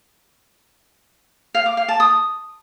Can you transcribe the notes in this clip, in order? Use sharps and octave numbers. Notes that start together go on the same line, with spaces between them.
F5
D6
F5
A5
D#6